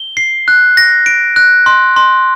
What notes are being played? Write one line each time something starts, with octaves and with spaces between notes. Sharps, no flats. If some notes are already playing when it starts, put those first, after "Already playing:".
Already playing: G7
C7
F#6
A#6
D7
F#6
C6
C6